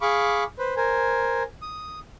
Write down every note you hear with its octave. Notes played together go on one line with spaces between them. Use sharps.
G#4 F5 B5 C#6 D6
B4 C5
A#4 C5 G#5
D#6